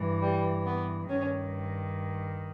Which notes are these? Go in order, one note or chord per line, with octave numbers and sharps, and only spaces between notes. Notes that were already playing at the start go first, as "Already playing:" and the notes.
Already playing: G2 E3
G3
B3
G2 D#3 C#4